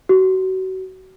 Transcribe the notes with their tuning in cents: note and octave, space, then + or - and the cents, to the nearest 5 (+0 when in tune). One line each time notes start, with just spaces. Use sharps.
F#4 +30